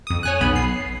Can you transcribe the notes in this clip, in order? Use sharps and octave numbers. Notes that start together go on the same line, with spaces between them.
F2 D#6
C#5 G#5 F#6
B1 B3 B5
C7